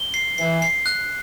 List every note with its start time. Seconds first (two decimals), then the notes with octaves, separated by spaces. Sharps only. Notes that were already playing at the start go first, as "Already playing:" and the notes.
Already playing: G7
0.14 C7
0.38 E3 C7
0.62 C7
0.86 F#6